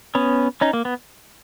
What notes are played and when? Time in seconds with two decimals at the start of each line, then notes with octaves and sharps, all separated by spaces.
0.15 B3 C#4
0.61 C#4 D#4
0.73 A#3
0.85 B3